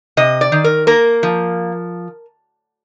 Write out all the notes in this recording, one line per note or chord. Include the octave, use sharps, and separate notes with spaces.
C3 D#5
D5
D#3
A#4
A#3 A#4
F3